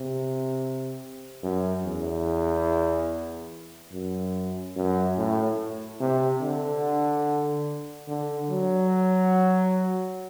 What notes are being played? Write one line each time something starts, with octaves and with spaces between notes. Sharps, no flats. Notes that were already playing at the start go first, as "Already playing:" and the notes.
Already playing: C3
F#2
E2
F#2
F#2
A2
C3
D3
D3
F#3